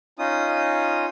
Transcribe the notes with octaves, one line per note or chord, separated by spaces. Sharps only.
C#4 D#4 F4 D#6